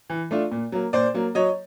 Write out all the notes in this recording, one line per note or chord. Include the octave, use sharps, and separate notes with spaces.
E3
A3 D4 F4
A#2
F#3 A#3
A#2 C5 D5
F#3 A#3
F#3 C#5 D#5